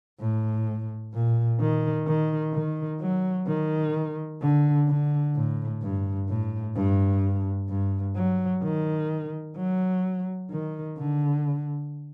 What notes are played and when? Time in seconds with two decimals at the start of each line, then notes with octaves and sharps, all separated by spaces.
0.20 A2
1.13 A#2
1.60 D#3
2.07 D#3
2.54 D#3
3.01 F#3
3.48 D#3
4.42 D3
4.88 D3
5.35 A2
5.83 G2
6.29 A2
6.76 G2
7.69 G2
8.16 F#3
8.63 D#3
9.57 F#3
10.51 D#3
10.98 D3